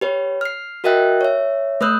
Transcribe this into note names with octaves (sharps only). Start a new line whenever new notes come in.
G4 B4 C#5
F6 C7
F#4 A#4 D#5 E5 G5 F#6
C#5 E5
A3 B4 D#6 E6 F#6 G6